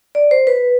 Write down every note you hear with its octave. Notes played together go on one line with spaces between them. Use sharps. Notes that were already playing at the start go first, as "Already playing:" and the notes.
D5
C5
B4